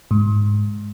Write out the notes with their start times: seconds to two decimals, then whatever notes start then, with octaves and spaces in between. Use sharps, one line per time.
0.11 G#2